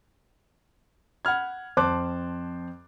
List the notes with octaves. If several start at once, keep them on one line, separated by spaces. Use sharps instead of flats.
F#5 B5 F6 G#6
F2 C5 A5 C6 D6 F#6